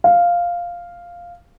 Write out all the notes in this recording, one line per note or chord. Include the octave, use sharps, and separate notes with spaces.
F5